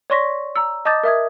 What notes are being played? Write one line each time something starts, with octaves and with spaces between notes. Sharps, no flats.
C#5 D5 C6 C#6 A#6 B6
A#5 E6
D#5 A5 D6 D#6 G6 A6
A#4 E5 D#6 G#6